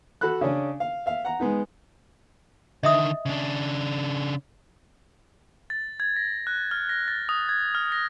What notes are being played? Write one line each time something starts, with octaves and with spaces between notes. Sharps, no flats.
F#4 A4 B5 F#6
C#3 C#4 D4
F5
E5 F5
F#5 A#5
G#3 B3 D#4
D3 D#3 D#5 E5 D#6
C#3 D4
A6
G#6
A#6
F#6
F6
A#6
A6
D#6
G#6
F6
A#6